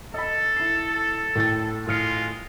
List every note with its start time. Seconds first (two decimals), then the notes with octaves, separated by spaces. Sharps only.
0.14 A4 D#5 B5
0.57 E4 C7
1.36 A2 G5 A6
1.87 A2 G#3 F4 F6 C#7